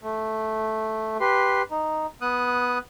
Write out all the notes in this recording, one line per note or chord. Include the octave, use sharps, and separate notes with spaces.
A3
G4 B4 C6
D#4
B3 D#6 F#6